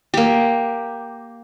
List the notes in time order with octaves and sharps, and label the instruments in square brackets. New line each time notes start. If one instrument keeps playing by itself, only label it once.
[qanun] A#3 G4